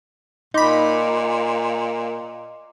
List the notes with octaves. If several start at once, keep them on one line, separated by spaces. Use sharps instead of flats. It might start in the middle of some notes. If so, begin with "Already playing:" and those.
A#2 D#4 D#5 B5 C6 D6